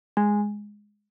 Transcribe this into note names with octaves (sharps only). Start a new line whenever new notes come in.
G#3